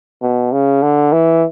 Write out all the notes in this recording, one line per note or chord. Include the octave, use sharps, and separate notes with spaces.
B2
C#3
D3
E3